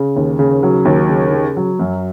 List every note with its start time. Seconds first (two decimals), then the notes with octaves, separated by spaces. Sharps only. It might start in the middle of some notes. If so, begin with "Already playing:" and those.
Already playing: C#3
0.16 D#2
0.39 C#3
0.63 F#3
0.85 D#2
1.09 C#3
1.32 C#3
1.57 F#3
1.79 F#2